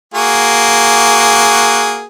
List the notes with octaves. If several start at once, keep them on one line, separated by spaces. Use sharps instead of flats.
A#3 F#4 G#4